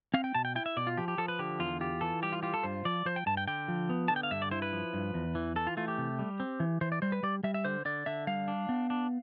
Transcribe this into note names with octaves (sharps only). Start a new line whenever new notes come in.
C4 F5
G5
B2 A5
G5
E4 G5
E5
B2 D5
F4
F3 G4
G4
F3 A4
B4
D3 G4
E2 F4
F4 G4
E3 A4
G3 G4
F4
F4 G4
A4
G2 C5
F3 D5
F3 C5
G5
G2 A5
G5
D3 G5
F3
B3
D3 A5
G5
F5
G2 E5
D5
E4 C5
B4
F3
G2
E2
E3
E3 A4
F4
A3 F4
G4
C3
G3
C4
E3
E3 C5
D5
G3 C5
B4
G3 D5
G3 E5
E5
D3 C5
D3 D5
D3 E5
G3 F5
D4
B3
D4